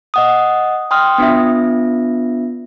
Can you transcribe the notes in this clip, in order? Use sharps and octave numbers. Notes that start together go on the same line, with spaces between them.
D#5 F#5 D#6
G5 C6 D#6 F6
B3 D4 F4 E5